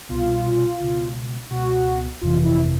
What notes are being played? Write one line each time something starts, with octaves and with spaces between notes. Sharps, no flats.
C2 B2 F4
C#2 B2
C#2 B2 F#4
G1 F2 C3 E3 F4
E4